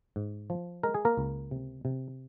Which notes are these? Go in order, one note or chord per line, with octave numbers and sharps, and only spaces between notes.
G#2
F3
G#3 A#4
G#4
A#3 A#4
C#2
C3
C3